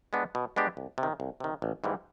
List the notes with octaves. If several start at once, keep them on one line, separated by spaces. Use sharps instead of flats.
G#3 B3 D4 G4
B2
G#3 B3 D4 G4
C2
C3
D#3
C2
C3 D#3
A1
G#2 E3 G3 A#3